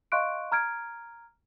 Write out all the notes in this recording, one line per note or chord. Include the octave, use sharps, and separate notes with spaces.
D#5 F5 C6 C#6 F#6 D7
A#5 F6 G#6 D7